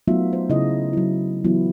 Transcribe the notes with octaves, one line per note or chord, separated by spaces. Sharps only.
F#3 A3 B3 D#4 F4 E5
C5
C#3 D#4 E4 G#4 D#5
F#3 E4
E3 F#3 B3 E4 F4